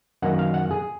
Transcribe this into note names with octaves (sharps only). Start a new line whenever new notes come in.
F#2 D#3 A#3 F#5
F5
F#5
G#4